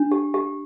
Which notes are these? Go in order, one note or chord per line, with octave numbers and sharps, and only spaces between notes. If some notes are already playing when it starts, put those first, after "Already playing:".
Already playing: D4
G4
G4